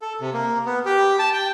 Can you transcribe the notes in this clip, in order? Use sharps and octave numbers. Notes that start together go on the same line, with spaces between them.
A4
C3
A#3
B3
G4
A5
G5